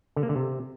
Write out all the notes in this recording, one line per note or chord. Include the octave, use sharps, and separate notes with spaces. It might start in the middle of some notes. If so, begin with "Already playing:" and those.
D3
A#3
D3
C3